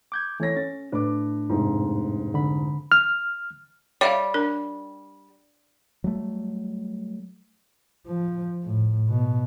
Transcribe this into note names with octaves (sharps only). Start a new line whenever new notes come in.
D6 G6 G#6
E3 A3 C#5 A#6
C#4 A6
A2 A3 D4 B4 D6
F1 G#2
D3 B5
F6
G3 C#5 E5 F5
D4 A#4
F#3 G3 A3
F3
A2
B2